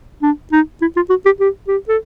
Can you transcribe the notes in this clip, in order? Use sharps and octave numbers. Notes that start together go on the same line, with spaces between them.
D4
D#4
E4
F4
F#4
G4
G4
G4
A4